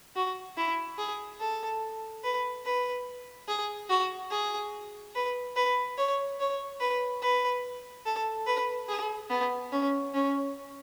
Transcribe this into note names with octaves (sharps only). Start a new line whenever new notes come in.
F#4
E4
G#4
A4
B4
B4
G#4
F#4
G#4
B4
B4
C#5
C#5
B4
B4
A4
B4
G#4
B3
C#4
C#4